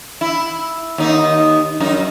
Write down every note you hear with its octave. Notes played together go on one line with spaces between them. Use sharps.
E4
D#2 D#4
F#2 D#4